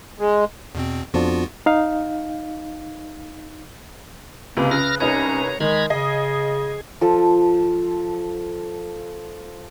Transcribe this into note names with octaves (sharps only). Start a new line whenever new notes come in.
G#3
E2 B2 C4
F2 F3 B3 D4 F4 F#4
D#4 F5
C#2 C3 A#3 B4
C#3 B4 F6 A#6
C2 C#4 D#4 B4 C#5 A#5
D#3 G#3 A#5 B5 G#6
C#3 G#4 D#5
F3 A4